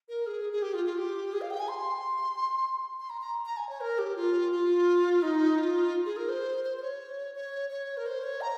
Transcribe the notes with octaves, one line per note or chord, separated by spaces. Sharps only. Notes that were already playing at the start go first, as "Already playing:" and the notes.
A#4
G#4
G#4
G4
F4
F4
G4
G#4
F5
G5
G#5
C6
C6
A#5
A#5
A#5
G#5
C#5
A#4
G4
F4
F4
D#4
F4
G#4
A#4
C5
C5
C5
C#5
C#5
C#5
A#4
C5
C#5
A#5